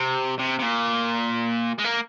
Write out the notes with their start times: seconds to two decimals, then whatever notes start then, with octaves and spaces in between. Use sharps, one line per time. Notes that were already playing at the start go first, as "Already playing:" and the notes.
Already playing: C3
0.39 C3
0.59 C3
0.62 A#2
1.78 G#3
1.84 A#3